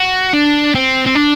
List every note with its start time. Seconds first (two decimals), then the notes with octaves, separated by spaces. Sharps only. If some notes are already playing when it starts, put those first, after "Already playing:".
Already playing: F#4
0.34 D4
0.75 C4
1.06 C4
1.15 D4